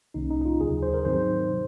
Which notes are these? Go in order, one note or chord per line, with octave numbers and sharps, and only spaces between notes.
C2 C3 D#3 A#3 C#4 D#4
D#4
D#4
F4
D#2 C#3 F#3 G#4
C5
A#4
G#2 D#3 F#3 C4 D#4 C5
C3